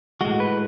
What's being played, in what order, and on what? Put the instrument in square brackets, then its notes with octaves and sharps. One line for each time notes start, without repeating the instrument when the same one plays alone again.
[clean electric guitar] A2 G#3 F#4
B4